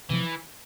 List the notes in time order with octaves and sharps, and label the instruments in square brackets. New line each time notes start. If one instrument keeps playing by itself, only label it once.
[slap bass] C3 F3 [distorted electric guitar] E3